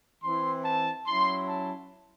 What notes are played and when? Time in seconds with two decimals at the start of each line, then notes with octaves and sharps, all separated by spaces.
0.22 E3 C4 E4 C6
0.64 A5
1.06 F#3 C#4 E4 C6
1.47 A5